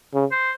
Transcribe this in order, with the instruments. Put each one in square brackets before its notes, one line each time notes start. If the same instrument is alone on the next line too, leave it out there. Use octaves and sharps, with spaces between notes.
[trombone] C#3
[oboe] C5